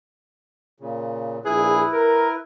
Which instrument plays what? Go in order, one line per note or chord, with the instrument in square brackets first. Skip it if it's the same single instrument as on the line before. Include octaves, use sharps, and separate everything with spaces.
[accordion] A#2 C#3
[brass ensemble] A#1 G#4 [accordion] E4 B4
[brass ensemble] A#4